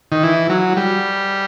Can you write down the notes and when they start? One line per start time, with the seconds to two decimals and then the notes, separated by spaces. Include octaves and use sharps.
0.12 D#3
0.23 E3
0.50 F#3
0.77 G3